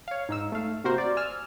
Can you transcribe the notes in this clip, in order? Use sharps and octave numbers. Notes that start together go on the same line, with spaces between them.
C#5 F5
G#2 D#4 E6
A3 F5
C3 A#3 F#4 A#4 C5
D5
G#5 E6 F6